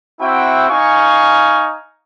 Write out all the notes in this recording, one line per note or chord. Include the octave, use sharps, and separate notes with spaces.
C4 E4 F#4 E5 F#5 G5
D#4 F5 G#5 C#6